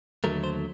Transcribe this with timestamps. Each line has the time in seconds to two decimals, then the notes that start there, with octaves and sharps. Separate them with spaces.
0.24 D#2 D3 F#3 A3 A#4
0.44 C5